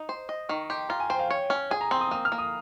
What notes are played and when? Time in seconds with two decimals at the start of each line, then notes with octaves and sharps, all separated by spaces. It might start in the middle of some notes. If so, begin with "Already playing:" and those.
Already playing: D#4
0.09 C5
0.29 D#5
0.49 D#3 C#6
0.70 G4 C6
0.89 F4 A#5
1.00 G#5
1.10 C5 G5
1.19 F5
1.30 C#5 G5
1.50 C#4
1.71 G#4 G#5
1.81 A#5
1.91 C4 C6
2.01 D#6
2.11 A#3 D#6
2.25 F6
2.32 A#3
2.38 D#6